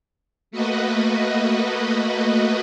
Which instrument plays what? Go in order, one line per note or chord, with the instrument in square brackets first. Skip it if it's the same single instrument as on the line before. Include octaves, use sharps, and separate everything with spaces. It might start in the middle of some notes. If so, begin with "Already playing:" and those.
[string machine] A3 A#3 F#4 B4 D#5